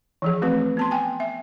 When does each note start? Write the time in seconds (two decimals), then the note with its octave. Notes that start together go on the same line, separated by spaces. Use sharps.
0.22 E3 F3 G#4
0.42 A3 C4 F#4 B4
0.77 B3 A5 C6
0.91 G5 G#5
1.20 E5